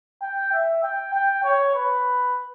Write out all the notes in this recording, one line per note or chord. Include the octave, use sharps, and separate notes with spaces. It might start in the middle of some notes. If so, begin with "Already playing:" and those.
G5
E5
G5
G5
C#5
B4